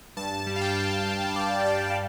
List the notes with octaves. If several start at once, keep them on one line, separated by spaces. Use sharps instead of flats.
G2 A5
G3
F5
G5
G3
G2
G2 D5
G3 G5
F5